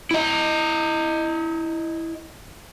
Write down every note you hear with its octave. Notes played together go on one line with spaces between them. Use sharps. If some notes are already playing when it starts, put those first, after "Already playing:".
E4 D#5